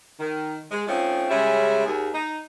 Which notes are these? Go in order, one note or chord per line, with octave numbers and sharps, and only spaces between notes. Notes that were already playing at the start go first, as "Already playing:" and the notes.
D#3
G#3
F3 A3 C4 C#4 D#4 F4
C#3 G3 G#3 C#4 E5
D#2 G#4
D#4